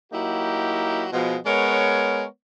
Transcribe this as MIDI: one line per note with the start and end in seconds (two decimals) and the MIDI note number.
0.13 1.07 54
0.13 1.07 58
0.13 1.07 63
0.13 1.07 64
0.13 1.07 66
0.13 1.07 67
1.13 1.36 47
1.13 1.36 53
1.13 1.36 56
1.46 2.25 56
1.46 2.25 59
1.46 2.25 70
1.46 2.25 73